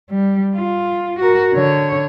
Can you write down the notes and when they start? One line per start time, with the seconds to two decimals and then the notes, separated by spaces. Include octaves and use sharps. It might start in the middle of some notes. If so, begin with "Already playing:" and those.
0.10 G3
0.55 F4
1.19 F#4 A#4
1.53 D3 C#5